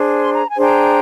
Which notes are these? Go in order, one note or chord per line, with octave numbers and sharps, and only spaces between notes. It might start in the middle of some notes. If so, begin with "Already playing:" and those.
Already playing: D4 G#4 C5
C6
A#5
G#5
D4 G#4 C5
G5 A#5